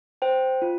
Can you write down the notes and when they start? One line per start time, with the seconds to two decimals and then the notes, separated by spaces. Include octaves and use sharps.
0.22 C5 G5
0.62 F4